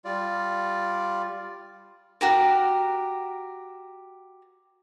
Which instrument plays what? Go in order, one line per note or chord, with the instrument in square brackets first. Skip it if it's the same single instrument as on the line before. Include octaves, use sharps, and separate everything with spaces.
[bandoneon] G3 F4 D5
[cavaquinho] F#4 G4 A#4